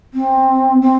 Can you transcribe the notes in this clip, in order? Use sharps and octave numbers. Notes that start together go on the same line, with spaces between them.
C4
C4